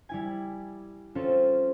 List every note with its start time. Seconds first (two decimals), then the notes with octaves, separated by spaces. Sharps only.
0.09 G3 E4 G#5
1.15 C4 C#4 F4 A4